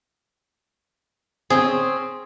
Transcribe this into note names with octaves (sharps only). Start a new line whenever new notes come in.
C4 C#4 G#4